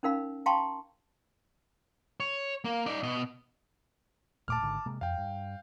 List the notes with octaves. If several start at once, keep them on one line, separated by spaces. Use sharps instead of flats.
C#4 D#4 A#4 F5 B5
F5 G5 A5 A#5 C6 C#6
C#5
A#3
D#4 D5
B2 D#5
D#1 A#2 A3 A5 D6 F6
G#1 G#2 D3
C3 G#3 A#3
F2 F5 G5
G2